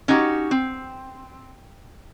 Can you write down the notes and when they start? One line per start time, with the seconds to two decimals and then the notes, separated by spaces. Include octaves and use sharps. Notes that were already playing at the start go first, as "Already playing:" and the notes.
0.08 C#4 D#4 F#4 G4
0.51 C4